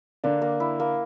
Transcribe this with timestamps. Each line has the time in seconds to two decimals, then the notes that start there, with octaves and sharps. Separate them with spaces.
0.24 D3 A#3 D4
0.42 A#3
0.60 E4
0.80 A#3